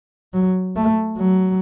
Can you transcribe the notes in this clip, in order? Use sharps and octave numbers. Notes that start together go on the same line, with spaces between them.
F#3
A3
F#3